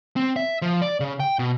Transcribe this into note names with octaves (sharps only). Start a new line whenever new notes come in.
C4
E5
F3
D5
C#3
G5
B2